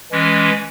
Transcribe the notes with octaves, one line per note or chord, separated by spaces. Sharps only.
E3 G#3 C#4